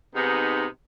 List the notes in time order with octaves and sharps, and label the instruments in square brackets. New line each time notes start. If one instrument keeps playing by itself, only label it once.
[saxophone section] G#2 C3 B3 D#4